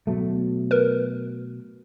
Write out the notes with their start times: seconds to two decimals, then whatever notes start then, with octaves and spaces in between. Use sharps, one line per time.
0.07 B2 F#3 A3
0.71 A#4 B4